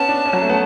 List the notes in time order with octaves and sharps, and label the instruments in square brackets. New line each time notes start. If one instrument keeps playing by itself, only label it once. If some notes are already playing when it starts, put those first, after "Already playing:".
Already playing: [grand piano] B3 C#4 [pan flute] A5
[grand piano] D4
C#4
F#3
A3
B3